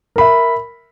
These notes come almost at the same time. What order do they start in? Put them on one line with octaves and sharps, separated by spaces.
A#4 B5 E5